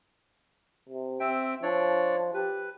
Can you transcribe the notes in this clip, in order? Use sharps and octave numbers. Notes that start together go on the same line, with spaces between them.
C3
C4 E5 G5
F3 D4 C#5 D5
G4 B4